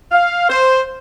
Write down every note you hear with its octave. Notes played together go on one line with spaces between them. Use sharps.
F5
C5